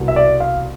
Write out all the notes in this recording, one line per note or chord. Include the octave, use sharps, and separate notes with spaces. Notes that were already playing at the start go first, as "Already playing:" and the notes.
Already playing: C2 B2 G3
E5
D5
F5